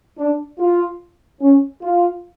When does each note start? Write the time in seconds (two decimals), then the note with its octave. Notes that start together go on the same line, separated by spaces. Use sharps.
0.18 D4
0.59 F4
1.41 C#4
1.82 F4